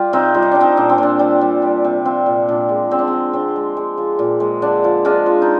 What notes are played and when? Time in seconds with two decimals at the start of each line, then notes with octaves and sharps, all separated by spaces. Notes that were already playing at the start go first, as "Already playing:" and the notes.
Already playing: G3 F4 G4
0.13 C3 C4 D#4
0.34 G3 F4
0.43 D#4
0.52 G3 D4
0.60 C4 D#4
0.77 A#2 D4
0.90 C4
0.98 A#2 D4
1.19 G3
1.41 G3
1.62 G3
1.84 C3
2.05 F3 C4
2.26 A#2
2.48 A#2 D4
2.69 G#3
2.91 D3 C4
2.99 D4
3.08 G#3 C4
3.33 D3 C4
3.56 G#3
3.77 G#3
3.98 F3
4.19 A#2
4.40 G#3
4.62 D3 D4
4.84 F3
5.05 G#3 D4 F4
5.26 F3
5.42 D#4